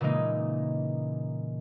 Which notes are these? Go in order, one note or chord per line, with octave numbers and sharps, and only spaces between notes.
A#2 C#3 E3 G#3 A#3 D#4